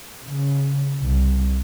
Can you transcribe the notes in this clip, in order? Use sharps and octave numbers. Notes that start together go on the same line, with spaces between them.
C#3
C2